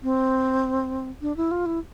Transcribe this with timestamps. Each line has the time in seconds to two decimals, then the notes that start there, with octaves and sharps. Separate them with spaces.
0.03 C4
1.22 D4
1.37 E4
1.51 F4
1.66 E4